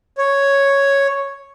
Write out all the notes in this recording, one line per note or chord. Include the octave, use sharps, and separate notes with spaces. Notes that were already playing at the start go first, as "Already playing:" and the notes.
C#5